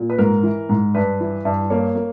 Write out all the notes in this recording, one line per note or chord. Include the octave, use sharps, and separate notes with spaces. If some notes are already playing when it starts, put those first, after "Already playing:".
Already playing: A#2
B4
G#2 A#4
E3
G#2
G2 B4
E3
G2
A#3 C#5
A#3